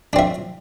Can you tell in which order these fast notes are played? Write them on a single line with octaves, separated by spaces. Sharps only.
D4 C4 E5